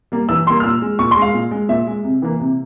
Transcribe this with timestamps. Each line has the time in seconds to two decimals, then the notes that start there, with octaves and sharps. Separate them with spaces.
0.12 G3 A#3
0.29 E3 E6
0.47 G3 C6
0.50 A#3
0.60 F6
0.64 A#2 E6
0.82 G#3
0.99 A#2 C#6
1.11 C6
1.17 G#3
1.22 F5
1.34 A#2
1.51 G#3
1.69 A#2 E5
1.87 G#3
2.04 C3
2.22 E3 A#3
2.40 C3